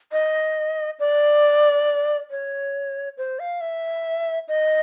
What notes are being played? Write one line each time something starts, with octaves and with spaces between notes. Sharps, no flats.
D#5
D5
C#5
C5
F5
E5
D#5